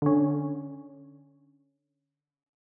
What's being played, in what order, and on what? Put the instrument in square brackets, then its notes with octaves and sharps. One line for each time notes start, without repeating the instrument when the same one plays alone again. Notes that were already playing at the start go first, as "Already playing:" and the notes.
[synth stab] D3 C#4